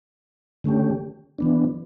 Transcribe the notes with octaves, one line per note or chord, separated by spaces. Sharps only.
D3 A3 C#4 G4
E3 B3 D4